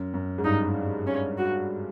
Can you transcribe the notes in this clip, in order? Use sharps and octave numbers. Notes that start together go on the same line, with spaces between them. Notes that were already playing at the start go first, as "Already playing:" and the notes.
Already playing: F#2
F#2
G#2
G2 D#4
C#4
F#4